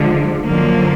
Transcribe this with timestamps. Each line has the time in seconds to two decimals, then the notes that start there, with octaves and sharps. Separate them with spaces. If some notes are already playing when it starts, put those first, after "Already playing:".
Already playing: D3 F3 G#3
0.45 F#2 D3 F3 A#3